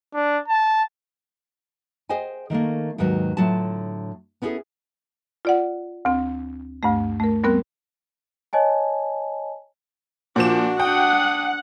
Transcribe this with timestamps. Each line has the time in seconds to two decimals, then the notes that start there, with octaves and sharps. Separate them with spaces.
0.14 D4
0.48 A5
2.09 G#4 C5 D#5 G5 G#5
2.50 D#3 F#3 A3 A#3
2.98 D#2 G#2 D#3 F#3 B4
3.37 A2 D3 F#3 F4 A5
4.42 B3 C#4 E4 F#4 G#4 A4
5.45 F4 D5 F#5
6.05 D2 C4
6.83 D2 G2 A3
7.20 A3 A#4
7.44 G3 B3 C4 A#4 F#6
8.53 C#5 D#5 G#5 A5
10.36 A#2 F3 D4 F#4 E7
10.80 D4 F#5 G5 D#6